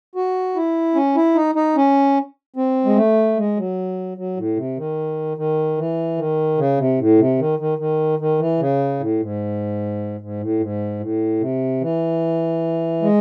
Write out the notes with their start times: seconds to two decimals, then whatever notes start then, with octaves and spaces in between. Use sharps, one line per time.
0.15 F#4
0.55 E4
0.95 C#4
1.16 E4
1.35 D#4
1.55 D#4
1.76 C#4
2.56 C4
2.85 G#3
2.96 A3
3.37 G#3
3.57 F#3
4.17 F#3
4.37 A2
4.56 C3
4.77 D#3
5.37 D#3
5.78 E3
6.17 D#3
6.58 C#3
6.78 C3
6.99 A2
7.19 C3
7.39 D#3
7.59 D#3
7.78 D#3
8.19 D#3
8.40 E3
8.60 C#3
9.00 A2
9.20 G#2
10.21 G#2
10.41 A2
10.60 G#2
11.00 A2
11.40 C3
11.81 E3
13.02 G#3